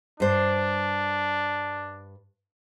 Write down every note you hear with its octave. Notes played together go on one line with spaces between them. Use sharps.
G2 D4 C5